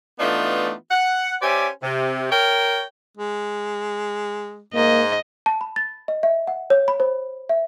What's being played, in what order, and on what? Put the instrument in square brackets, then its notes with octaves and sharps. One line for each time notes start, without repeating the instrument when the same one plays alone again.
[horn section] E3 A3 B3 D4 D#4 F4
F#5
C#4 G4 C5 D5 E5 G#5
C3
A#4 C#5 G5
[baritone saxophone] G#3
[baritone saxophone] G#2 [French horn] A#3 [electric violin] D#5
[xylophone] A5
B5
A6
D#5
E5
F#5
C#5
B5
C5
E5